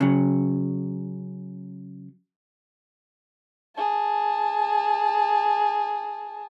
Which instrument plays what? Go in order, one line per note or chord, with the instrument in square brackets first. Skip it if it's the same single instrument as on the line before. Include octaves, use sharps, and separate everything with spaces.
[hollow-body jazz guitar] C#3 F#3
[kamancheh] G#4 A5